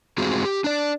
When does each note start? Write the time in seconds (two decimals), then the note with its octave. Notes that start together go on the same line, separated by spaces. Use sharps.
0.18 G#3 C4 F4 F#4 G#4
0.45 G4
0.64 D4 D5